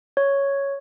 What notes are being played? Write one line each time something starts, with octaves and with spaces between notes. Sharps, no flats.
C#5